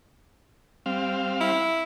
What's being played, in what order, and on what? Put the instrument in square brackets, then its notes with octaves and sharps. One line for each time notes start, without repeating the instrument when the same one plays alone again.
[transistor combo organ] G3 C4 F5
[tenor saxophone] E4